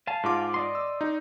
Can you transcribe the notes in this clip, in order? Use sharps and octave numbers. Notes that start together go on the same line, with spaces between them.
F5 G#5 A5
G#2 F4 D6
D5 D#5 C6
E6
D#4